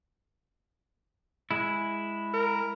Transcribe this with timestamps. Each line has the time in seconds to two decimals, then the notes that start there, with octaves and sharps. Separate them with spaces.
1.51 G#3 E4
2.34 A#4